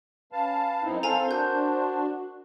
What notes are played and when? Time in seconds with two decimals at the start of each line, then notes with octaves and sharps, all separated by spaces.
0.32 C#4 B4 F5 A5
0.84 F#2 C4 D#4 E4
1.03 C4 A4 C5 F5 G#5 A#5
1.28 D4 F#4 A#4 G6